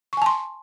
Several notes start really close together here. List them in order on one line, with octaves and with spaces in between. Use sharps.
C#6 G#5 A5 C6